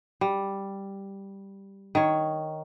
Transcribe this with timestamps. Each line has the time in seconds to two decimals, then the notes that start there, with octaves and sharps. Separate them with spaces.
0.21 G3
1.95 D#3 C#5